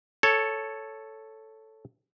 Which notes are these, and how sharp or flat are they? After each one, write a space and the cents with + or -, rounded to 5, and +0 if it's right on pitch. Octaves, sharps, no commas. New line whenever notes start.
A4 +0 C#5 +0